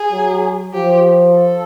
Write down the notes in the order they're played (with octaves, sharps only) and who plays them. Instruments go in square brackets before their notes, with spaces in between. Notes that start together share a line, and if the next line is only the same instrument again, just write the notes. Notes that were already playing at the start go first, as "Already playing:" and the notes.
Already playing: [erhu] G#4
[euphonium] F#3
[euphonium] F3 [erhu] G4
[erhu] A4